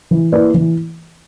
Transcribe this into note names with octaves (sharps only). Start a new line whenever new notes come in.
E3
A#3 E4 B4 D5
E3